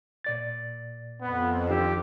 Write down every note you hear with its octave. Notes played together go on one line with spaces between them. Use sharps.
A#2 D5 A6
F2 B3
D#3 D4 G4 E6